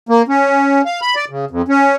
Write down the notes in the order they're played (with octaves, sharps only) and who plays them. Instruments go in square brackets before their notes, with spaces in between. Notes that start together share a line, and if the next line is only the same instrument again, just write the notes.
[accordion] A#3
C#4
F5
B5
D5
C#3
F2
C#4